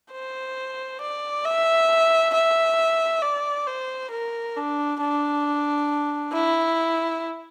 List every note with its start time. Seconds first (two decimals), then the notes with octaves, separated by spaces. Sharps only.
0.12 C5
1.01 D5
1.45 E5
2.34 E5
3.22 D5
3.67 C5
4.11 A#4
4.56 D4
5.00 D4
6.33 E4